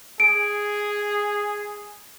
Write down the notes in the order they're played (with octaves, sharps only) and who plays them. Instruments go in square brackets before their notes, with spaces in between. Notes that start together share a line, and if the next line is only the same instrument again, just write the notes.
[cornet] G#4 [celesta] D7